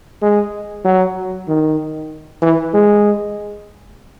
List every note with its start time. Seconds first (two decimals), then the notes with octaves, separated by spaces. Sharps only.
0.22 G#3
0.85 F#3
1.48 D#3
2.42 E3
2.74 G#3